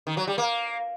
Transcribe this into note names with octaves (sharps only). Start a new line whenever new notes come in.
D#3
F#3
G3
A#3